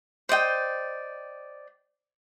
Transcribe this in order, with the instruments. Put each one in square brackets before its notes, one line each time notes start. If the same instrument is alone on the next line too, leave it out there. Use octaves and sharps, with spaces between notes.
[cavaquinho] C5 D5 D#5 G5